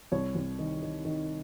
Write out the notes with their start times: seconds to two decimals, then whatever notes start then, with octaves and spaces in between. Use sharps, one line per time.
0.12 C2 C#5
0.35 C2
0.59 D#3
0.83 D#3
1.05 D#3